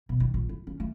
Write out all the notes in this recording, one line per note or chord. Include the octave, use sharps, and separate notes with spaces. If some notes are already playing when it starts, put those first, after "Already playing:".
B2
D#3
A#1
E4
C#4
A3